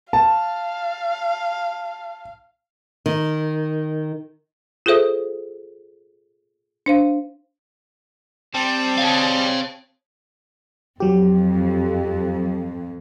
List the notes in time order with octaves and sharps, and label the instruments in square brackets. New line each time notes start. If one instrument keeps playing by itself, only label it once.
[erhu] F5 [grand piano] A5
[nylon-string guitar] D#3
[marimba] F4 G#4 A4 C5 E5 D#6
D4 C5 F5
[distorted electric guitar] G3 [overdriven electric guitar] C4 [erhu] A5
[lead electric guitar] C#5 F5
[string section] F2 [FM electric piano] F#3 G4